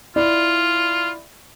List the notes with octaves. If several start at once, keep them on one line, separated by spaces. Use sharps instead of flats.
E4 F4 D5